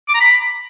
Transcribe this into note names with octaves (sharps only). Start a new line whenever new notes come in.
D6
A#5
B5